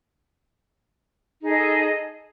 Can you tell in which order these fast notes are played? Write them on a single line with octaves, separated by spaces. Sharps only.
D#4 G#4 A4 D#5